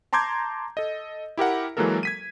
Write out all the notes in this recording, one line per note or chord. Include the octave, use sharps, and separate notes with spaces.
A5 A#5 C6 D6 G6 G#6
A4 D#5
E4 G4 A#4 F#5
E3 F#3 G#3 A#3 A4 A#4
G#6 B6 D#7